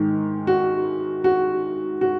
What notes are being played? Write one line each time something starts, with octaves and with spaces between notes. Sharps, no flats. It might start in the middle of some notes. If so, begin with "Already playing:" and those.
Already playing: G#2 D#3 G#3
F#4
F#4
F#4